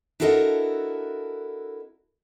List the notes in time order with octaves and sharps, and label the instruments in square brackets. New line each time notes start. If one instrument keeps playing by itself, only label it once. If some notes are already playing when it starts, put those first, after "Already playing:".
[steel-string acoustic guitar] D4 E4 F#4 A4 A#4 D#5